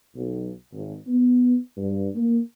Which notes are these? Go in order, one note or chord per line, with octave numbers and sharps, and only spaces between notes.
B1
G#1
B3
G2
A#3